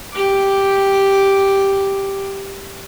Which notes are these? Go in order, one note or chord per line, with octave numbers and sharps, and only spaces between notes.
G4 D6